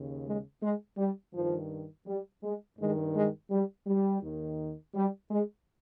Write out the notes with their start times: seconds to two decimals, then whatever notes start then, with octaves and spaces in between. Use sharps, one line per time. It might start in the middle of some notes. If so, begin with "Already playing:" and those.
Already playing: D#2 C#3
0.26 G#3
0.62 G#3
0.98 G3
1.34 G2 D#3 F3
2.07 G3
2.43 G#3
2.78 G2 D#3 G#3
3.15 G#3
3.51 G3
3.87 G3
4.22 D#2 D#3
4.95 G3
5.31 G#3